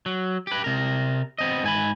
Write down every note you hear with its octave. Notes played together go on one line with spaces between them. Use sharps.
F#3
G4 B4
C3 A#4
B3 C4 D#5
G#2 G#5 B5